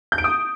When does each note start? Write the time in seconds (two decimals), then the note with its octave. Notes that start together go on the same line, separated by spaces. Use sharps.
0.12 G6
0.18 D7
0.24 D#6